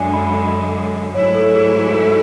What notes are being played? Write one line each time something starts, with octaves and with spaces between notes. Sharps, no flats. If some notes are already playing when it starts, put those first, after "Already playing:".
Already playing: F#2 D3 G#3 D5 E5 G#5
B5
G#2 F#3 A3 E4 C#5
A4
G#4
G#4
A4